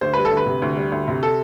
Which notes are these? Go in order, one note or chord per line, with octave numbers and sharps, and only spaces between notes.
D2 C5
G3 B4
A4
D2
B4
C3
D2
G3
D2
C3
A4